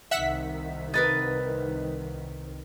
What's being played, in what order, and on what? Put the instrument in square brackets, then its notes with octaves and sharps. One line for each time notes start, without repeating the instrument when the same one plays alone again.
[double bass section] C2 D#3 [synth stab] E5 F#5 B6
[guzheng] A#4 B4 D#5 [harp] A6